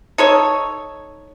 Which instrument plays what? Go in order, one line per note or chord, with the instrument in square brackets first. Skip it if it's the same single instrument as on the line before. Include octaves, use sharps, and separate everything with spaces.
[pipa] D#4 A4 C#5